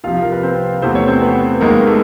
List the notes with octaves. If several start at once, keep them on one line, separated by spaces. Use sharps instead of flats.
C2 C3 F3 F4 F5
A#4
B4
C4 C5
E2 C3 E3 A3 C5
C#5
C4 C5
B3 B4
D#2 D#3 G#3 A#3 B3 A#4
A3 A4